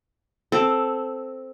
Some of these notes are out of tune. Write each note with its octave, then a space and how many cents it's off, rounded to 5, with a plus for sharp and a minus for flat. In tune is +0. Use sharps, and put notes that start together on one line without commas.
C4 +0 A4 +0